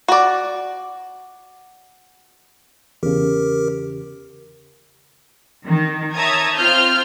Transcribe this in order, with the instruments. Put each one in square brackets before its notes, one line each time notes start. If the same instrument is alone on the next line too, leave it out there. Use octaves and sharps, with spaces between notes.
[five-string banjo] F#4 D5
[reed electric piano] E2 C#3 [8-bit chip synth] G4 A#4
[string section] D#3
C#5 E5 A5 A#5 D#6 G#6
C4 F4 F6 G6